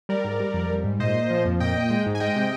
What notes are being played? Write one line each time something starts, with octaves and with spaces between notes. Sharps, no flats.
G3 A#4 D5
G#2
G3
F2
G3
G#2
A#2 C5 D#5
A#2
F3
F2
A#2 D#5 G5
A#2
G#3
G#2
G#5
G#3 D#5 G5
C3